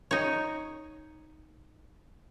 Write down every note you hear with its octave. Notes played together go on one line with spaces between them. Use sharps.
D#4 C#5